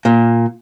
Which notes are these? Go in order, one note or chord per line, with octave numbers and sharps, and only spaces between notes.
A#2